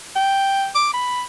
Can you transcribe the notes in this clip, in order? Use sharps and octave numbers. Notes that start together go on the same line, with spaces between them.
G5
D6
B5